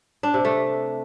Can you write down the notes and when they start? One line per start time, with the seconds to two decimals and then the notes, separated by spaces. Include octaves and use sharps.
0.23 D4
0.34 C3
0.45 A3